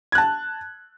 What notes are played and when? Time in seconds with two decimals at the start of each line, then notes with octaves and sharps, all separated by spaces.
0.12 G#6
0.15 F#6
0.18 A5